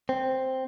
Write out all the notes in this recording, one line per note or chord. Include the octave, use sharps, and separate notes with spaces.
C4